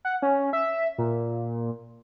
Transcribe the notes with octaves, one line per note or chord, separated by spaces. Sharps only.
F#5
C#4
E5
A#2